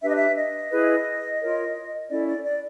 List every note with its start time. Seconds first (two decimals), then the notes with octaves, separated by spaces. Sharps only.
0.02 D4 G4 B4 E5
0.10 D#5
0.16 E5
0.37 D#5
0.71 E4 G#4 B4
1.40 F4 A#4 C#5
2.09 C#4 E4 A4 D5
2.27 D5
2.44 D5